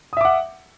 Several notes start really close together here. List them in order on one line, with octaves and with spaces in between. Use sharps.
D#6 E5 D6 F#5